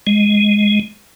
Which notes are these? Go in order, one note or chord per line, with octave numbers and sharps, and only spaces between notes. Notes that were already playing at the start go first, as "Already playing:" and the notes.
G#3